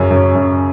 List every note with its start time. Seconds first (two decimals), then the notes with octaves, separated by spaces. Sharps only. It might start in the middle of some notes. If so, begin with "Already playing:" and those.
Already playing: F#2 C#3 C#4
0.11 F#2
0.35 F#2